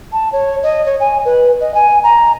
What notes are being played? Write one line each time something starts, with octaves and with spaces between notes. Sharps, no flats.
A5
C#5
D#5
C#5
G#5
B4
D#5
G#5
A#5